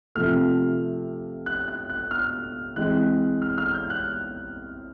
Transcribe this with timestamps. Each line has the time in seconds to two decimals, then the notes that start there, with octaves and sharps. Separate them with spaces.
0.15 C3 F3 A3 F6
1.46 F#6
1.68 F#6
1.90 F#6
2.11 F6
2.76 E3 G#3 C4 F#6
3.42 F6
3.58 F6
3.74 G6
3.90 F#6